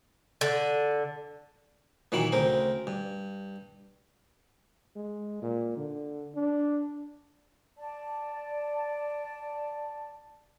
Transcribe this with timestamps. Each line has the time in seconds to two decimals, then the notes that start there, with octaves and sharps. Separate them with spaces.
0.41 D3
2.12 A#2 D#3 E3 F#3 A5 B5
2.32 D2 C#3 C4 A#4
2.87 G2
4.96 G#3
5.42 A#2
5.77 D3
6.35 D4
7.78 D5 A5